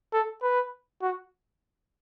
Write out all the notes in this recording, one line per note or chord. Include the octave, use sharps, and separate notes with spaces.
A4
B4
F#4